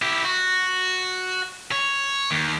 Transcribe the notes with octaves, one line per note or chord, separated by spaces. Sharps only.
E4 G4
F#4
C#5
D#2